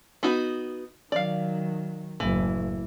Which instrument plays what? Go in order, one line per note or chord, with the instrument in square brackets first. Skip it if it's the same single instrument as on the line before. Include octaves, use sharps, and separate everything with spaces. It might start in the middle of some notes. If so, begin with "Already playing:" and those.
[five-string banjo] B3 D#4 F#4
[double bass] D#3 F#3 [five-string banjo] D5 F5
[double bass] F#1 A2 [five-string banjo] E3